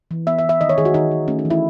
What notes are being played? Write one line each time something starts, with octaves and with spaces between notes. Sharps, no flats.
E3
B3 E5
E5
E3
E5
D#3 D#5
C#5
D#3 G#4
F#4
D#3 D#4
D#3
A3 C#4
D#4
E3
E4